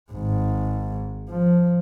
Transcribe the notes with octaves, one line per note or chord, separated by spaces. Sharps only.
G#1 G#2
F3